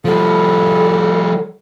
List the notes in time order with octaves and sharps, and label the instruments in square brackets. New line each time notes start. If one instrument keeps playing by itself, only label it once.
[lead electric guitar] F3 G3 [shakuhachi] A4